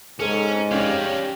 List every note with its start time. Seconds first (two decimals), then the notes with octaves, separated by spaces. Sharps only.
0.20 G#2 C#4 A4
0.71 C#4 G4 C#5 D5 F5